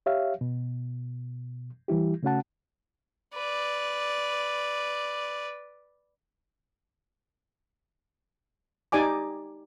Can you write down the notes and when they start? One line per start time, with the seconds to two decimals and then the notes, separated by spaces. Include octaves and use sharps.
0.06 G4 C#5 E5 F5
0.41 B2
1.88 E3 G3 E4 G4
2.23 C#3 A3 C#4 F#4 F#5 A5
3.35 B4 D5
8.92 D#4 G4 D5 G#5 D6